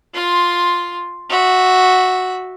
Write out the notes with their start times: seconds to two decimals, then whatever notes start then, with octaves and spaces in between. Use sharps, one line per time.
0.14 F4 C6
1.30 F#4 E5